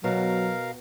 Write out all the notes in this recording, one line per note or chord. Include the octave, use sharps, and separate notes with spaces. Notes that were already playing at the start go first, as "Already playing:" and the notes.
B2 F#3 A#4 F5